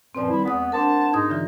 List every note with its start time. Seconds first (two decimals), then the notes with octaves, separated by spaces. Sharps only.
0.15 F#2 A#2 F3 C4 B4 D5
0.29 D#3 G3 E4
0.44 E2 G#3 B3 D#6
0.72 D4 A#4 C5 F#5 A5
1.13 G#2 D#4 D#6 G#6
1.29 D3 E3 F4